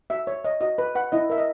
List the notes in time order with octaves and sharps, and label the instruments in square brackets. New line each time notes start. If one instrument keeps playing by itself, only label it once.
[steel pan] F#4 E5
C#5
C#5 D#5
F#4 D#5
B4
B4 F#5
E4 D#5
A#4 E5
D#5